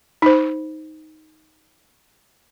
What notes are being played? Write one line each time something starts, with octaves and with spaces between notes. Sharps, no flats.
D#4 C5